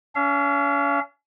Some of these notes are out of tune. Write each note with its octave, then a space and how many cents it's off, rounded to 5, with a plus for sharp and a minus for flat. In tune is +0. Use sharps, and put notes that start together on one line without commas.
C#4 +35 F5 -40